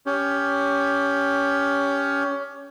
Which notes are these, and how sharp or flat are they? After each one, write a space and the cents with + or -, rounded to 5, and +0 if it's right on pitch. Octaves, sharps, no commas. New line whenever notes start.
C#4 +20 G4 +10